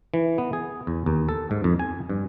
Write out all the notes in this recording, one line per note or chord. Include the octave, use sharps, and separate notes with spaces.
E3
B3
G#4
E2
D#2
A4
G#2
F2
G#5
G2